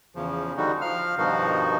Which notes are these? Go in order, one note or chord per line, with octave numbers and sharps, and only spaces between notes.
E2 C#3 F3
D3 G3 D#4 F#4
F3 F5 F6
G2 B2 D#3 F3 D#4 F#4